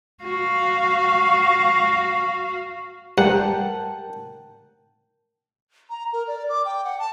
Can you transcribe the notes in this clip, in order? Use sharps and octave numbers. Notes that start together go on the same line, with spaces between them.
F#4 F5
G2 A#4 F#5 G5 A5
A#5
A#4
D5
D6
G5
F#5
A5